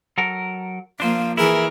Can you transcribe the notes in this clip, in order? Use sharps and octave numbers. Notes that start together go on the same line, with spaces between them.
F#3 A4 A#4
F3 A#3 D4 C5 F5
E3 E4 G#4 A#4